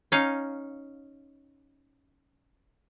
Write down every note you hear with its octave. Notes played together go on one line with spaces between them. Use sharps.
C#4 D#4 F5